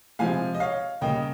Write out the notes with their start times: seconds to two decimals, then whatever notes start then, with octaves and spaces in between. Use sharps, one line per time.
0.19 C3 F3 G#3 F5 G#5
0.55 D#5
0.60 C#5 F5
1.01 C#3 G3 A#3 D#5 G5